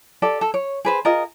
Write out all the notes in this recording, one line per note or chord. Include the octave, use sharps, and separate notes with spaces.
G4 A4 D5
A4
C#5
G#4 B4 C5
F4 G#4 A#4 D#5